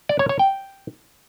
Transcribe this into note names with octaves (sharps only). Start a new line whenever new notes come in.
D5
C#5
C#5
G5